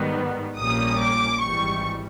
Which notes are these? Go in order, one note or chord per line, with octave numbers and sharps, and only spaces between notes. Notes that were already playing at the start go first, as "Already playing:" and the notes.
Already playing: G#2 D#3 G3 B3
A#1 A#2 G3 A#3 C#4 D#6
D6
G#1 G#2 E3 G3 C#6